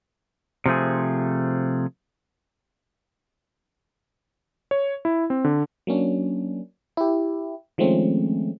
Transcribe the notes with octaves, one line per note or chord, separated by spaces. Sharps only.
C3 F3 A3 G#4
C#5
E4
C4
D3
F#3 A#3 C#4 D4
E4 G4
D#3 F3 G#3 A3 C4 C#4